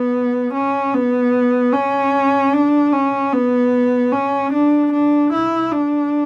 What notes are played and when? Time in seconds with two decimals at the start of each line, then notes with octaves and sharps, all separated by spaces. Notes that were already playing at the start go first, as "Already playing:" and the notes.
Already playing: B3
0.53 C#4
0.94 B3
1.73 C#4
2.53 D4
2.93 C#4
3.32 B3
4.12 C#4
4.52 D4
4.92 D4
5.33 E4
5.72 D4